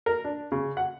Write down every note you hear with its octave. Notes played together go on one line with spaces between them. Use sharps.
A#4
D4
C#3
F#5